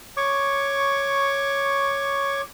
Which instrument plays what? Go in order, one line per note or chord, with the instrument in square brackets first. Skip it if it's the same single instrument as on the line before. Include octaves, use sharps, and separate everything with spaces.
[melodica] C#5 C#6 D6